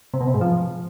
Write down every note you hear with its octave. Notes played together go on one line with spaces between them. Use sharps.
C3
B2
C3
G#2
F3